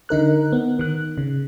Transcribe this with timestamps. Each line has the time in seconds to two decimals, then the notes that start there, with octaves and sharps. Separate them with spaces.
0.09 D3 D#4 A#4 F#6
0.52 B3
0.79 D#3 F#6
1.18 C#3